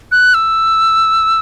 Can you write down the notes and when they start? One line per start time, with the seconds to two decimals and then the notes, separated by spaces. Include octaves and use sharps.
0.12 F#6
0.34 E6